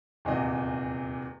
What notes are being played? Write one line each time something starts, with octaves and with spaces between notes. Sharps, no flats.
D#1 E2 C3 D#5